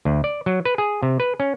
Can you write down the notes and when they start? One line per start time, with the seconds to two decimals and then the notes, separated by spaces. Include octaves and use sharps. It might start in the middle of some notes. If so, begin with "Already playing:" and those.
0.05 D2
0.24 D5
0.46 F#3
0.65 B4
0.78 G#4
1.03 C3
1.20 B4
1.40 C#4